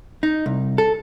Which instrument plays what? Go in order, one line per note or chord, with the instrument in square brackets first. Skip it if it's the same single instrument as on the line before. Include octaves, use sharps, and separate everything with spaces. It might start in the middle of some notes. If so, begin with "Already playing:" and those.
[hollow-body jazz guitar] D#4
C2
A4